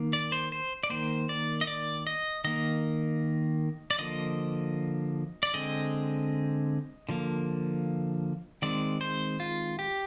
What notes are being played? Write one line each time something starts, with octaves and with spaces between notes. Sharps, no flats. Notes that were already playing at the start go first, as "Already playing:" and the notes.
Already playing: D#3 A#3
D5
C5
C5
D5
D#3 A#3 C5
D5
D#5
D5
D#5
D#3 A#3 D#5
D5
D3 F3 A#3 D#5
D5
D3 G#3 C4 D#5
D3 F3 A#3
D#3 G#3 C4 D5
C5
F4
G4